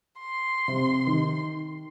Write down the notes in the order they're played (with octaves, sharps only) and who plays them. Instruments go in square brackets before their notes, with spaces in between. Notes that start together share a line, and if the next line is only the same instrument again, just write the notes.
[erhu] C6
[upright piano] C3
D#3